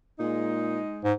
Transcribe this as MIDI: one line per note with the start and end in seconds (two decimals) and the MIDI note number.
0.19 0.79 46
0.19 1.02 56
0.19 1.02 63
1.04 1.13 44